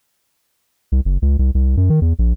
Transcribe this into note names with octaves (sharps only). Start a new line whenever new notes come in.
C2
F#1
C#2
C2
C2
F#2
D#3
E2
A#1